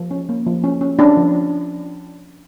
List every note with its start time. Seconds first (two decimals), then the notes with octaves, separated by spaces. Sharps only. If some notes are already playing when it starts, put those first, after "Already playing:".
Already playing: F3
0.11 C#4
0.29 A#3
0.46 F3
0.64 C#4
0.81 C#4
0.99 C#4 D4
1.17 F3